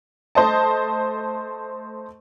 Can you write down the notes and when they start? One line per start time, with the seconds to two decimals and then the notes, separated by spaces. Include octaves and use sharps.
0.35 A3 C5 D#5 A5